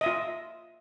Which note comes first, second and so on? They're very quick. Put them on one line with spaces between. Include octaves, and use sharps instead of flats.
D#5 E5 F4